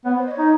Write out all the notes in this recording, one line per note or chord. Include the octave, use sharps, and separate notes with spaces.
B3 C#5
C5
D#5
C#5
D#4